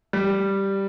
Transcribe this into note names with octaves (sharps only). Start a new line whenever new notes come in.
G3